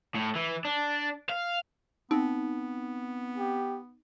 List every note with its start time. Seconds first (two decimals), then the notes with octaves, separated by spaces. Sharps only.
0.15 A2
0.35 E3
0.65 D4
1.30 F5
2.11 B3 C4 D#4
3.38 G4